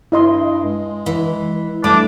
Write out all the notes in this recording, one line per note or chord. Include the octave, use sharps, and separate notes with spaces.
G2 E4 D#5 C6
G#3
E3
G3 A3 D4 D6